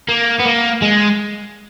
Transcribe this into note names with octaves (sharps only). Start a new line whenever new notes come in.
A#3
B3
A#3
G#3